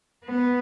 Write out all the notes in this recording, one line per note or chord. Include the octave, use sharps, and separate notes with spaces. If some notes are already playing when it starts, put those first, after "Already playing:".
B3